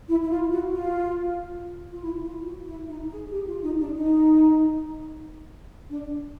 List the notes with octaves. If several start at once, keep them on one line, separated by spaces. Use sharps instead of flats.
E4
E4
F4
F#4
F4
F4
E4
F4
F#4
E4
D#4
G#4
G4
F4
D#4
D4
D#4
D4